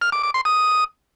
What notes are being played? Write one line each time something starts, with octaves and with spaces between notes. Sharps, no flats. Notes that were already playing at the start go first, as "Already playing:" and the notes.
F6
D6
D6
C6
D#6